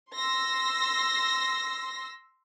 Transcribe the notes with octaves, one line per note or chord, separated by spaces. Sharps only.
C6 E6 A#6